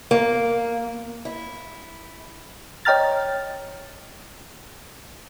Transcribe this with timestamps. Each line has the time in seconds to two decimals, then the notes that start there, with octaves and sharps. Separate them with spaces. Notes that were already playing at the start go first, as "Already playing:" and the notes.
0.11 A#3
1.25 E4
2.85 C#5 D#5 G5 A#5 F6 A6